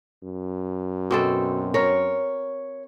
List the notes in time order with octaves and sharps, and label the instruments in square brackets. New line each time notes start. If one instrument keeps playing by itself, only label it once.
[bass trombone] F#2
[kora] B2 C4 A4
[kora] A#4 [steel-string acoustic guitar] C#5